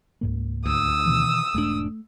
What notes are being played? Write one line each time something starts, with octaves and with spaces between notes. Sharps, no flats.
C#2 G#2 A#3
D2 D#6 E6
B2 D#3 E3
E1 G#2 A3 D4